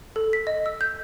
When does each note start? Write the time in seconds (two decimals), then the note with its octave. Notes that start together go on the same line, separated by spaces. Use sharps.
0.16 A4
0.33 B6
0.47 D#5
0.66 E6
0.81 G6